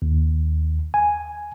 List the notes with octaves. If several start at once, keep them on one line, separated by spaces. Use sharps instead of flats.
D#2
G#5